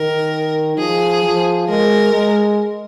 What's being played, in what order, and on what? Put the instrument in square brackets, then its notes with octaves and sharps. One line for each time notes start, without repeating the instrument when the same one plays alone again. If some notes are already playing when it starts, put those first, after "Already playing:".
Already playing: [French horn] D#3 [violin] A#4
[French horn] F3 [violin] G#4
[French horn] F3
[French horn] G#3 [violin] A#4
[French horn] G#3